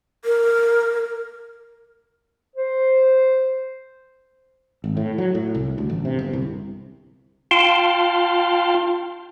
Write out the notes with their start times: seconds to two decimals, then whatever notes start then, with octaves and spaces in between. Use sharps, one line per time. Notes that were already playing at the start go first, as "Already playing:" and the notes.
0.25 A#4
2.56 C5
4.84 G#1
4.97 A2
5.18 F#3
5.35 A2
5.55 C2
5.78 D2
5.90 A1
6.05 C3
6.19 G1
6.33 C2
7.51 F4 F5 G5 A5 C6